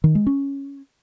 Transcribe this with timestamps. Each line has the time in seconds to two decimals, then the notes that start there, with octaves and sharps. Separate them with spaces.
0.04 D#3
0.15 G#3
0.27 C#4